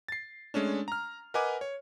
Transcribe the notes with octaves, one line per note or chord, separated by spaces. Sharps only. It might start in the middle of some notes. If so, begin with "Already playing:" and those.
A6 C7
G#3 A3 C#4 D4
A#5 F6
A#4 B4 D#5 F#5 G#5 D6
C#5